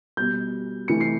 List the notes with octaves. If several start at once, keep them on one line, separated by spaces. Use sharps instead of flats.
B2 G3 G6
C3 E3 A3 C#7
C7